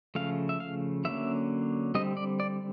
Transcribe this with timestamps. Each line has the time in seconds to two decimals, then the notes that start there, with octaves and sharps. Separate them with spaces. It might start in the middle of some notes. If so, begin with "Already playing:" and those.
0.15 C#3 F3 A3 F5
0.49 E5
0.60 F5
1.05 D3 F#3 A#3 C#4 E5
1.95 D3 G3 C4 D#5
2.17 D5
2.40 D5